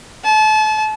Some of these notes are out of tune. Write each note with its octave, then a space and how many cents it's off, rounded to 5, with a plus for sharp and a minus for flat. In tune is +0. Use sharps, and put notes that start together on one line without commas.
A5 -35